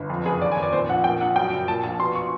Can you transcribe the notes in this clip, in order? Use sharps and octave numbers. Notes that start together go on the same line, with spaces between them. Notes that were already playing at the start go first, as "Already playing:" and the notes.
Already playing: G1
F2
F#1 G#4
D#2 D5
G#5
F1
D5
A#2 C5
A#1 F#5
A#2 G5
A#1 F#5
F#2 G5
F#1
A#2 A5
A#1 A5
B2 C6
C#6